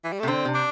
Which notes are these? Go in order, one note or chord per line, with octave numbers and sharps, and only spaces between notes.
E3
G3
A3
C3
D3 C4
C3
D4